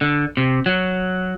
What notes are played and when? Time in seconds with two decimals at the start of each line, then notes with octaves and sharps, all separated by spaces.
0.01 D3
0.37 C3
0.66 F#3